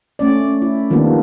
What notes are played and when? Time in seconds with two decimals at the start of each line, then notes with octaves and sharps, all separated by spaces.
0.19 A3 C#4 D5
0.62 E4
0.90 D#3 F3 G3 A#3 B3 D4